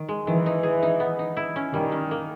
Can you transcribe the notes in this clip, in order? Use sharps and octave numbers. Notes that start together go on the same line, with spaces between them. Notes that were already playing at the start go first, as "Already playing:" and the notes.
Already playing: D#3
G#3
D#3 E3
D#4
G#4
D#4
B3
D#4
E4
C#4
D#3 G3
C#4
A#3